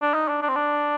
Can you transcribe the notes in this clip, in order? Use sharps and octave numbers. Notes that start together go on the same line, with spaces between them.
D4
D#4
D4
D4
C4
D4